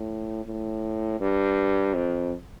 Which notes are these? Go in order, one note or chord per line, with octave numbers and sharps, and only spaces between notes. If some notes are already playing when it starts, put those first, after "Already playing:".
Already playing: A2
A2
G2
F2